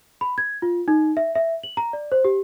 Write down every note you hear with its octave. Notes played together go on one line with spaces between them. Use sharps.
B5
G#6
F4
D#4
E5
E5
F#7
A#5
D5
C5
G4